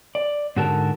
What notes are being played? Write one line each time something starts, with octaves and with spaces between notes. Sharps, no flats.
D5
G#2 D3 F#4 A4 A#4 A5